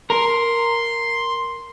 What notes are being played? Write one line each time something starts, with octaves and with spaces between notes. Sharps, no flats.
A#4 C6